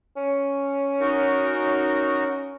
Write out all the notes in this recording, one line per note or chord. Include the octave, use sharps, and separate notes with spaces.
C#4
D#4 F#4 A#4
C#4